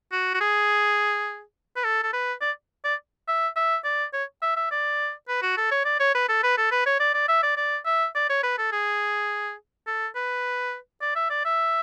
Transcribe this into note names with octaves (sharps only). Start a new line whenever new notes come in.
F#4
F#4
G#4
B4
A4
A4
B4
D5
D5
E5
E5
D5
C#5
E5
E5
D5
B4
F#4
A4
C#5
D5
C#5
B4
A4
B4
A4
B4
C#5
D5
D5
E5
D5
D5
E5
D5
C#5
B4
A4
G#4
A4
B4
D5
E5
D5
E5